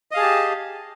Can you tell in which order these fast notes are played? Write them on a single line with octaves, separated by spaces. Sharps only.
D#5 F5 G#4 A5 G4